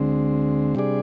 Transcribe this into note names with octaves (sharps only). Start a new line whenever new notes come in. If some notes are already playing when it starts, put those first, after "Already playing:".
Already playing: D2 D3 G#3 C4
C3 G3 D4 G#4 D5